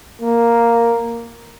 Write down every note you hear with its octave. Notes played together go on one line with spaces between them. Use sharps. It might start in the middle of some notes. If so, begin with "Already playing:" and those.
A#3